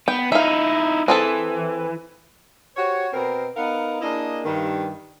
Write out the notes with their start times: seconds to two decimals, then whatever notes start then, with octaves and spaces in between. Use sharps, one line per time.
0.08 B3 G5
0.32 D#4 E4 E5 F5
1.08 E3 C4 G#4 A4
2.77 F#4 G4 C5 C#5
3.13 B2 B3 C4 A#4
3.56 B3 D#4 A#4 F5 F#5
4.01 A#3 D4 E4 G#4 D#5
4.45 G2 D#3